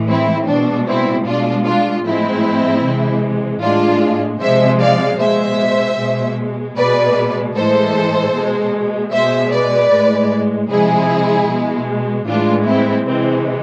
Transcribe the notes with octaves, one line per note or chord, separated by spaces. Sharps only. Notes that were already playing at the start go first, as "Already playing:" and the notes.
Already playing: A2 E3 G#3
C4 E4
B2 G#3 D4
C4 E4
B2 G#3 D4 F4
D4 F4
A2 F3 G#3 C4 E4
C3 E3 G#3
A2 G#3 D4 F4
C3 F3 G#3 C5 E5
D5 F5
B2 G#3 C5 E5
B2 G#3
B2 G#3 B4 D5
A2 E3 G#3 A4 C5
B2 G#3
B2 G#3 C5 E5
B4 D5
A2 G#3
C3 F3 G#3 E4 G#4
B2 G#3
A2 E3 G#3 D4 F4
C4 E4
C3 E3 G#3 C4